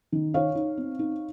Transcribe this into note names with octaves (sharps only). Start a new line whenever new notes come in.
D#3
D#4 C#5 F5
D#4
C4
D#4